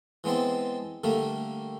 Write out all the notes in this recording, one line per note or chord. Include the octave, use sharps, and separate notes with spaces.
E3 G#3 B3 C4 A5
D3 G3 A3 A#3